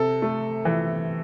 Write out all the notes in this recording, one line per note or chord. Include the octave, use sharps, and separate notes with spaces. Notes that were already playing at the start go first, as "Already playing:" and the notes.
Already playing: C3 A4
A3
E3